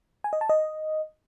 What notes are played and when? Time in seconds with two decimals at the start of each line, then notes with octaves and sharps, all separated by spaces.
0.24 G#5
0.33 D#5
0.41 A5
0.49 D#5